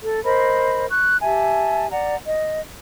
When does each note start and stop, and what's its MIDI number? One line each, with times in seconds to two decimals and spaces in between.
0.03 0.23 69
0.25 0.86 70
0.25 0.86 72
0.25 0.86 75
0.25 0.86 83
0.90 1.17 85
0.90 1.17 90
1.22 1.89 67
1.22 1.89 76
1.22 1.89 80
1.22 1.89 81
1.91 2.16 74
1.91 2.16 78
1.91 2.16 82
2.27 2.60 75